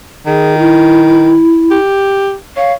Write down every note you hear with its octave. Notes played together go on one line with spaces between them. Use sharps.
D#3 G#4
E4
G4
C#5 F5